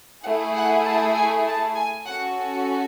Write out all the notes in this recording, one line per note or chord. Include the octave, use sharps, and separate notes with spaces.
A3 E4 G#4 F#5
F#5
A5
G#5
A5
G#5
C#4 F#4 A4 F#5